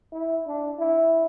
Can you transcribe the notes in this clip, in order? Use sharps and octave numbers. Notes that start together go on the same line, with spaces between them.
E4
D4
E4